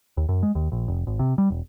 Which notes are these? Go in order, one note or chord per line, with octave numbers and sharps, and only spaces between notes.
D#2
F#2
G#3
D#2
A#1
F1
G#1
C3
G3
E1